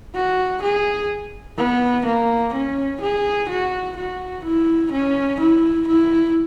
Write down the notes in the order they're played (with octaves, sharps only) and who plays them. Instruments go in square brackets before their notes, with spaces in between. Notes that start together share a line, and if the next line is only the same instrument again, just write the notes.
[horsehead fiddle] F#4
G#4
B3
A#3
C#4
G#4
F#4
F#4
E4
C#4
E4
E4